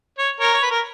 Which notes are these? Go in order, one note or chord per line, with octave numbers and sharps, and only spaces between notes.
C#5
A#4 C#5
C#5
B4
A#4